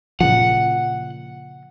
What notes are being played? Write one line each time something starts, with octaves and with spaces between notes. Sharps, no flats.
A#2 C#3 F3 F#5